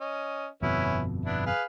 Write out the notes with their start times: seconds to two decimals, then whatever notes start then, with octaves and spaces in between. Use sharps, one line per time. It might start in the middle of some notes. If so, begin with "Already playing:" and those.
0.01 C#4 D#5
0.62 G1 F2 B2 B3 C#4 E4
1.26 B3 D4 E4
1.46 G#4 B4 F5